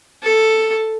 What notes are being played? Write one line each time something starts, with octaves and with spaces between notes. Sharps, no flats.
A4